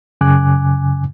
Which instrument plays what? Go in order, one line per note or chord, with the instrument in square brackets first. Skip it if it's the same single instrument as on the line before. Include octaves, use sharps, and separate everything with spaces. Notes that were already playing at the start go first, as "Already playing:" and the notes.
[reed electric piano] F#2 C#3 G#5 D6 F#6